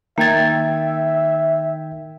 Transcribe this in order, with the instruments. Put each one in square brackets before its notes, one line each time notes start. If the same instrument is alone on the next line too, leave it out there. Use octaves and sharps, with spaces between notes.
[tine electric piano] D#3 G5 G#6 [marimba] A#3 A6 [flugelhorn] E5